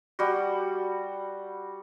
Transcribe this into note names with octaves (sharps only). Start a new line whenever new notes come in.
G3 F#4